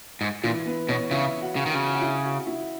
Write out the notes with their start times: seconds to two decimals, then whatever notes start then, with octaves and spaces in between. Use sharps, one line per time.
0.21 G#2
0.43 A#2 E3 E4
0.65 B3 B4
0.88 B2 C#4 C#5
1.11 C#3 E4 E5
1.41 F#4 F#5
1.56 C#3
1.66 D#3
1.71 C#3 F#4 F#5
1.94 F#5
2.01 E4 E5
2.24 F#4 F#5
2.47 E4 E5